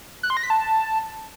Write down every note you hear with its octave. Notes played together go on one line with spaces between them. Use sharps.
F#6
C6
A#6
B6
A5